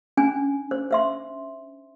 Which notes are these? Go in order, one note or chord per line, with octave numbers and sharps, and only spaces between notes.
C#4 D4 G#5
C5
C5 E5 C6